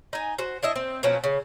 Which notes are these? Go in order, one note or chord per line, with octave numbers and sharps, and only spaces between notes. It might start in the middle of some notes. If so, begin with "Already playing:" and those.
D#4 G#5
F#4 C5
D4 E4 D#5 E5
C4
B2 F3 F#3 C#4
C#3